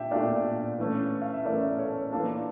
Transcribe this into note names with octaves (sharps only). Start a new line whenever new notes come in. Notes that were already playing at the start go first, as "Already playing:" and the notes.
Already playing: A#2 D4 G4 E5 G5
A#2 A3 D4 D5 F5
E3 A3 C#4
F5
E5
E3 A3 C#4 A#4 D5
A4 C#5
E3 A#3 D4 F4 A4